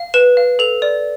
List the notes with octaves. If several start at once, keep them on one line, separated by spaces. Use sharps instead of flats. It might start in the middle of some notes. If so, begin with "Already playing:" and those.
Already playing: F5
B4 E7
F5
A4 F7
D5